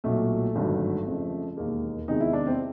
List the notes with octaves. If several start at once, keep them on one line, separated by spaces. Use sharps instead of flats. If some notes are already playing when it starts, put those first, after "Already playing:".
B1 A#2 F#3 A3
G#1 G2 D3 F#3
F2 C#3 F3 G#3
E1 D#2 D#3 G#3 A#3
E2 C3 D#3 G#3 D#4
E4
D4
C4